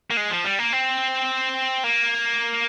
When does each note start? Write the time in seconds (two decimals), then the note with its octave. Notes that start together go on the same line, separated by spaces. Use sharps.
0.10 A#3
0.17 G#3
0.30 F3
0.45 G3
0.59 A#3
0.73 C4
1.84 A#3